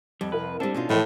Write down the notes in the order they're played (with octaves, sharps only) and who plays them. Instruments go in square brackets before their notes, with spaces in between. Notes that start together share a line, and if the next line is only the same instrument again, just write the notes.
[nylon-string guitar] F2 [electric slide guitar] G3
[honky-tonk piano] C2 A#4 [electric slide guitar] B4
[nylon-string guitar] G3 C4 [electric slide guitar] D4 A4
[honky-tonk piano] B2 [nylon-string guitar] C#4 D#4 F4
[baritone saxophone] A2 [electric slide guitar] E3 [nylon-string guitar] F3 E4 G5 [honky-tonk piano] A#4 D#5